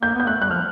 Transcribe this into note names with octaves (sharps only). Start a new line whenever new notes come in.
A#3 G6
B3
G6
A3 F#6
G3 F#6
F3 F6